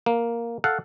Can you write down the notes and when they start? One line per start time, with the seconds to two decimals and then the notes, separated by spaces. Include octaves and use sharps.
0.06 A#3
0.64 A4 F5 F#5